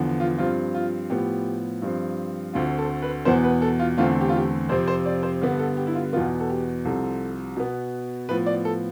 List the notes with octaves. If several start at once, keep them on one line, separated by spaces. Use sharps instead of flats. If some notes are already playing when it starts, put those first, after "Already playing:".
Already playing: E2 D3 F3 B3
F4
G2 F3 C4 F4
F4
A2 F3 B3 G4
G2 F3 C4
D2 D3 A3 C4 F4
A4
B4
E2 B2 B3 C5
B4
A4
F4
E2 D3 A3 C4 F4
G4
F4
G4
F2 C3 F3 C4 C5
C5
D5
C5
G2 D3 G3 B3
A4
G4
E4
F4
E2 B2 B3 F4
A4
G4
C2 C3 F3 C4 A4
B2 B3
A2 F3 B3 B4
D5
A4